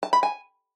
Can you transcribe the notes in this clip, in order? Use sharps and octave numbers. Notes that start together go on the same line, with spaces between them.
A5
B5
G#5